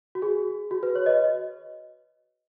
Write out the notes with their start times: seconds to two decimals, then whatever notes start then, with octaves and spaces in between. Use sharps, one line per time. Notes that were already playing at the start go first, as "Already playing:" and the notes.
0.15 F#4
0.22 G#4
0.71 F#4
0.83 B4
0.95 C#5
1.06 B4 D#5